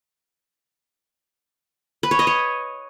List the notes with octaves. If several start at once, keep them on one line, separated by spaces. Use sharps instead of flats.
B4
C#5
D#5
C#5